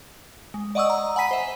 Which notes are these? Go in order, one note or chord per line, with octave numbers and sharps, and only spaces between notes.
G#3
D5 D#5 F#5 C#6 D#6 E6
A#5
F#5 G#5 B5 B6 D#7
C5 E5